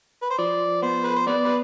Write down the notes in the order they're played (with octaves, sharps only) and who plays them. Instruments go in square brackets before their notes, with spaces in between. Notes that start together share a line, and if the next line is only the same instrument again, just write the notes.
[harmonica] B4
C5
[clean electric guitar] F3 [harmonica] D5
[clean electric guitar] B3 [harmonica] C5
[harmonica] B4
C5
[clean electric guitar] B3 [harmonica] B4 D5
[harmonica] B4